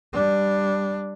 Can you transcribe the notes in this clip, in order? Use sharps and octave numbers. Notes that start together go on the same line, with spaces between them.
G3 D4